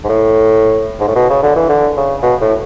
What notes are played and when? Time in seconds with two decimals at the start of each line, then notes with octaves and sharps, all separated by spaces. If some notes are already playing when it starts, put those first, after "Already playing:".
0.04 G#2
0.09 A2
1.00 G#2
1.08 A2
1.16 B2
1.30 C#3
1.43 D3
1.56 E3
1.69 D3
1.97 C#3
2.23 B2
2.41 A2